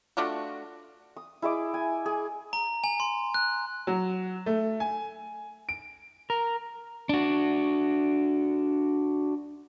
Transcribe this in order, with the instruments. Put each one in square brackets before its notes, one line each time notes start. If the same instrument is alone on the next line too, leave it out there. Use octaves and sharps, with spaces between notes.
[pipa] A3 D4 F4 F#4
[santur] D#6
E4 G#4 D#5 D6
G#5
G#4
[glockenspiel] A#5
G#5
C6
F#6
[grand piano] F#3
A3
G#5
D7
[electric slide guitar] A#4
[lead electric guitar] D4 F#4